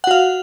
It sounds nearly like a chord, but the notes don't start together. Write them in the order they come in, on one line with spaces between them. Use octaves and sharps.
F#5 F#4 F5